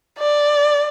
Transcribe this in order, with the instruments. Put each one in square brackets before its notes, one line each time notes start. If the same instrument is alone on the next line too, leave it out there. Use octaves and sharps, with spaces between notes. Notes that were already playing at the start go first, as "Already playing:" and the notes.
[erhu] D5